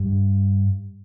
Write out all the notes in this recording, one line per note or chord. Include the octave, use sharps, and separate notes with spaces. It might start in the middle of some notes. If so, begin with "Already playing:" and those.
Already playing: G2